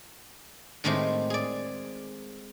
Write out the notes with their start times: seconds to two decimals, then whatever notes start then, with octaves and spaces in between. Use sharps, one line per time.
0.84 A2 D#3 G#3 A3 C4 G4
1.30 G#4 D5